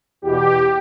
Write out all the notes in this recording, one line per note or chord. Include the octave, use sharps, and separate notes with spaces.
E2 B2 G4